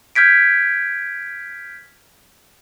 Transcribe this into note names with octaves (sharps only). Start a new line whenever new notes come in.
F6 G6 G#6 B6 D7